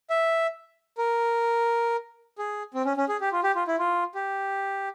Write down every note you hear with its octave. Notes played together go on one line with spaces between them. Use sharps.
E5
A#4
G#4
C4
C#4
C#4
G#4
G4
F4
G4
F4
E4
F4
G4